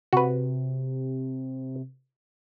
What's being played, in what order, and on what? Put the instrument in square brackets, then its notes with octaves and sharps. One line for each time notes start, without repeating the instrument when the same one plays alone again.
[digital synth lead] C3 [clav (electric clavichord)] F#4 B4